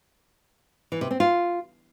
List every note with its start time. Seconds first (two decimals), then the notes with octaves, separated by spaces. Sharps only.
0.92 E3
1.01 C3
1.11 C4
1.20 F4